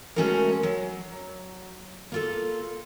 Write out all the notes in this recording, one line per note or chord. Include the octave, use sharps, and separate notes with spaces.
G#3 A3 C#4 D#4 F#4 A#4
F#3
A#3 F4 A4